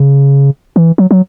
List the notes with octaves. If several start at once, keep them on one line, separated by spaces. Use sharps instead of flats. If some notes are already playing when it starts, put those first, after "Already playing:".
Already playing: C#3
E3
F#3
F#3